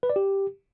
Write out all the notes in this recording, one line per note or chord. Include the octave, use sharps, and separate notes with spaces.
B4
D5
G4